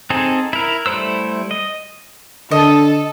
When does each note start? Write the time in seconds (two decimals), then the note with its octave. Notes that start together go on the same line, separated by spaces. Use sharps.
0.10 C4 D#4 G#4 A4
0.53 E4 A#4
0.86 G3 A3 E4 C5 E6
1.51 D#5
2.51 D3 A4 D#5